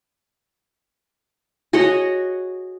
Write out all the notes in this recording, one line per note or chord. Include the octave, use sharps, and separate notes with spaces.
F#4 G#4 C#5 D#5